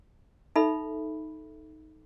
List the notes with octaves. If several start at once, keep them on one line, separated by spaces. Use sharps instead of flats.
D#4 A4 E5 B5